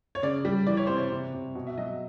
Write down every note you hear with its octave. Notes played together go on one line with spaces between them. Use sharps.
C#5
C#3 D5
G3
E3 D5
C#5
C3 C5
C#5
C3
C3
B2
E5
F#3 D#5